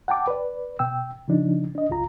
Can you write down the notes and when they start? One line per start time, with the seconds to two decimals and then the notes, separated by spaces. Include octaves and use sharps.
0.08 F#5 G5 A5 D6
0.27 B4 D5
0.79 B2 G5 E6
1.28 C#3 F3 D4 D#4
1.75 D4 D#5
1.90 C#2 F#2 F4 A#5